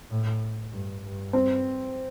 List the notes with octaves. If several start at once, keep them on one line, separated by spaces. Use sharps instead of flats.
A2
G2
G2
C4